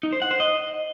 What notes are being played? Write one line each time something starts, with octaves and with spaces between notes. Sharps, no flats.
D#4
C5
F#5
C5
D#5